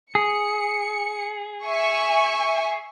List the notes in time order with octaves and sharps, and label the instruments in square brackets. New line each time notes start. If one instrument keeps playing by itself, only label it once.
[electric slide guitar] G#4 [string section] C#7
[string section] E5 G#5 C#6